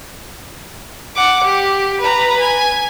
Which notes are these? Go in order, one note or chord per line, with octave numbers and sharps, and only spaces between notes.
F#5 D6
G4
B4 A#5
G#5